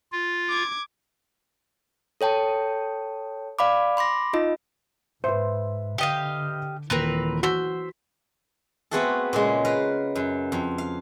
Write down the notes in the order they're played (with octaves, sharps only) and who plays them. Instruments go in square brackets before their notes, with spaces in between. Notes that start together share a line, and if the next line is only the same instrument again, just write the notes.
[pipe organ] F4
[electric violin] D6 G#6
[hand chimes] A4 C#5 G5 A5
D5 F5 B5 D6
B5 C6 D6 A#6
D#4 F4 D#5
[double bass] G#2 [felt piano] B4 E5 [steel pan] C5
[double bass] D3 [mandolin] G4 D#5 F5
[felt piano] D#1 [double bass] E3 [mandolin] C4 A#4 B4
[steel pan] F#4 [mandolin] C5 E6 [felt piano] B6
[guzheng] A3 B3 C4 F#4 G#4 A4
A#2 C#3 G#3
A#4 B4 F5
F#2
F2
F5